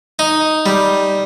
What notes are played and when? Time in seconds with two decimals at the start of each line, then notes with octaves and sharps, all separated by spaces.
0.19 D#4
0.66 G3